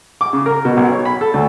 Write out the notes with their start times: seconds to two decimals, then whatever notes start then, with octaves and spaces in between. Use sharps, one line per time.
0.21 D6
0.33 C#3
0.46 A#4
0.65 B2
0.77 B1
0.91 C#5
1.05 B5
1.21 A4
1.34 D2